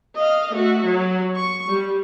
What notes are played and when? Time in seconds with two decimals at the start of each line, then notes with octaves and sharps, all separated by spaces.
0.15 D#5 F5
0.52 A3 F#4
0.85 F#3
1.36 C#6
1.67 G3